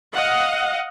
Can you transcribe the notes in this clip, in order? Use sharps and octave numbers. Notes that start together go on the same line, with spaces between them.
D#5 F5 F#5